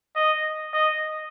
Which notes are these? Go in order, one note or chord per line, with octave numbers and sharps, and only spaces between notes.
D#5
D#5